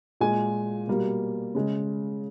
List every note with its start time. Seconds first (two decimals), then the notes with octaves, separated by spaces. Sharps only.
0.21 A#2 G#3 G#5
0.87 B2 G3 A#3
1.55 C#3 G#3